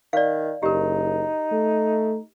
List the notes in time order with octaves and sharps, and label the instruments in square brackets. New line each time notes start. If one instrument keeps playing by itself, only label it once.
[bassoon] D#3 [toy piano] D5 F5
[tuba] F#1 [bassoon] D#4 [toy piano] G4 A#4
[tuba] A3